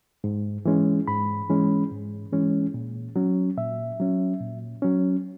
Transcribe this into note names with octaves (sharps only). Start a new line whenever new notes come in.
G#2
E3 G#3 C#4
G#2 B5
E3 G#3 C#4
G#2
E3 G#3 C#4
A#2
F#3 C#4
A#2 E5
F#3 C#4
A#2
F#3 C#4